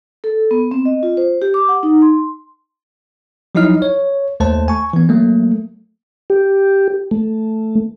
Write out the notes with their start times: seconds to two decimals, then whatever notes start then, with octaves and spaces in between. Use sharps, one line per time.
0.24 A4
0.51 B3
0.71 C4
0.85 D#5
1.03 F4
1.17 C5
1.42 G4
1.54 D6
1.69 F#5
1.83 D#4
2.02 C6
3.55 F3 F#3 D#4 E4 D#5 F6
3.82 C#5
4.40 D#2 A3 C5 A5
4.68 G#5 C#6
4.93 E3 B3
5.09 F#3 A3 A#3
6.30 G4
7.11 A3